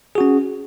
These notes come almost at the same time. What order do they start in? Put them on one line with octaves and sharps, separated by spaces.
G#4 F#4 C#4